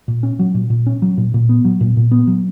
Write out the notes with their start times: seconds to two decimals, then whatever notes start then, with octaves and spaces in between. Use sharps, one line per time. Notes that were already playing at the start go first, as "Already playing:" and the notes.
0.08 A#2
0.23 C#4
0.39 F#3
0.55 A#2
0.70 A#2
0.87 C#4
1.02 F#3
1.18 A#2
1.34 A#2
1.49 B3
1.65 F#3
1.81 A#2
1.97 A#2
2.12 B3
2.27 F#3